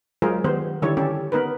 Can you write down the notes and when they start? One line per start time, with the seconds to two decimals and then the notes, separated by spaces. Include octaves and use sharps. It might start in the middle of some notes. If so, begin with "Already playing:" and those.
0.22 F#3 G#3 F4 G#4 A#4 C5
0.44 D#3 G3 B3 C5
0.82 D3 D#3 G3 E4 A4 C#5
0.97 G3 C#4 G4 A4
1.32 B3 D#4 A#4 B4